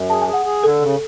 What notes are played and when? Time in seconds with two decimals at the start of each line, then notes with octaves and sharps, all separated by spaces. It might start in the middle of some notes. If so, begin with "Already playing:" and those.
Already playing: F#2
0.10 G#4 A5
0.22 G#5
0.27 G#4
0.33 F#5
0.45 G#4
0.63 D3 A4
0.81 C#3